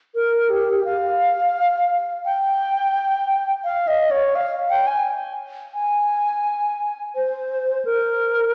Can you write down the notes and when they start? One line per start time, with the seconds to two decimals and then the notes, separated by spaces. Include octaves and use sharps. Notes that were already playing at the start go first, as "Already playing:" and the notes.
0.15 A#4
0.50 G4
0.85 F5
2.25 G5
3.64 F5
3.88 D#5
4.11 C#5
4.35 F5
4.70 G5
4.87 G#5
5.74 G#5
7.15 C5
7.85 A#4